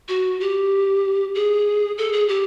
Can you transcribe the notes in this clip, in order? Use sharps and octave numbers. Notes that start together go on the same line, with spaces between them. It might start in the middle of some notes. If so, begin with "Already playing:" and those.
F#4
G4
G#4
A4
G#4
G4